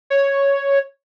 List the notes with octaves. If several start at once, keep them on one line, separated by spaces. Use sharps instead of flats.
C#5